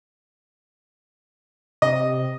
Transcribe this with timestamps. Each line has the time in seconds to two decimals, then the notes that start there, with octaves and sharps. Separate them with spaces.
1.82 C3 D#5